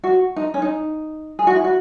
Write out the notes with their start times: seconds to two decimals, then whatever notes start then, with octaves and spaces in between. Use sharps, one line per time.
0.04 F#4
0.36 D#4
0.54 C#4
0.62 D#4
1.39 G#4
1.47 F#4
1.56 E4
1.64 F#4